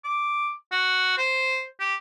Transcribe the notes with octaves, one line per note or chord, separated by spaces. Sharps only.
D6
F#4
C5
G4